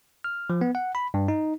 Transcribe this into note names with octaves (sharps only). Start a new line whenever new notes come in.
F6
F3
B3
F#5
B5
G2
D#4